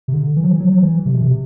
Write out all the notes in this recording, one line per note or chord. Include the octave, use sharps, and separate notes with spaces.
C3
D3
E3
F#3
E3
F#3
F#3
E3
C3
B2
C3